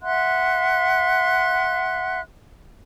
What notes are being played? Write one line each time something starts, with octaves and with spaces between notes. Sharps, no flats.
E5 F#5 C6 F#6